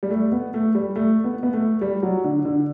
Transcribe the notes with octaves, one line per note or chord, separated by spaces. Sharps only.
G3
A3
B3
A3
G3
A3
B3
B3
A3
G3
F#3
D3
D3